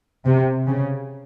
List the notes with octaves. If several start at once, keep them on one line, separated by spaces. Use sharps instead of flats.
C3
C#3